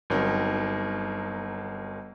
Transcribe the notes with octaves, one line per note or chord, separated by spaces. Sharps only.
G1 F#3 C4 D#4 A#4